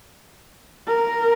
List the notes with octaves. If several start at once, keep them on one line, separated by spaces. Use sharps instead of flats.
A#4